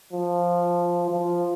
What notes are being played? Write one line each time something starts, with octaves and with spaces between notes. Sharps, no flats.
F3
F3